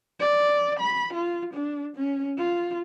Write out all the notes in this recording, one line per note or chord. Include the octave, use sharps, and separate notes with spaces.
D5
B5
F4
D4
C#4
F4